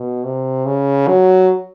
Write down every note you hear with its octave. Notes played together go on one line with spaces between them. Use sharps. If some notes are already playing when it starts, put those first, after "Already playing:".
Already playing: B2
C3
C#3
F#3